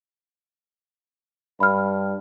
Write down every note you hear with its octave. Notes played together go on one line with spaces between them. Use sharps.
G2 B5 F6